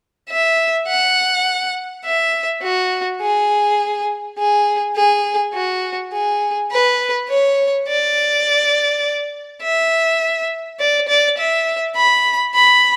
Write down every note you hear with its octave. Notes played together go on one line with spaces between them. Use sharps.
E5
F#5
E5
F#4
G#4
G#4
G#4
F#4
G#4
B4
C#5
D5
E5
D5
D5
E5
B5
B5